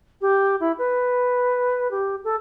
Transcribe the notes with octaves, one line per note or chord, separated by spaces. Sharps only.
G4
E4
B4
G4
A4